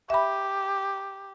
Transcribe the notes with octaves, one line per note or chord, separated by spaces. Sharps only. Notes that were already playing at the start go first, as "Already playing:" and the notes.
G4 E5 B5